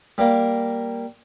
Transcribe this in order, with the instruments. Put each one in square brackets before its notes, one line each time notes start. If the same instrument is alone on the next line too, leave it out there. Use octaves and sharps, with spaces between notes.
[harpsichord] G3 A#3